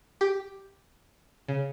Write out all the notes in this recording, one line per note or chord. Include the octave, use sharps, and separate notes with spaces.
G4
C#3